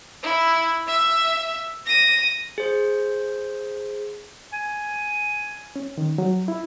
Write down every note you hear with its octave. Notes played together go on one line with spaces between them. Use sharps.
E4
E5
A#6 D#7
G#4 C5
G#5
C#4
D#3
F#3
E4